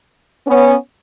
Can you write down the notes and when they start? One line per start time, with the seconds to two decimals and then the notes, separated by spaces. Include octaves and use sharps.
0.46 B3 C#4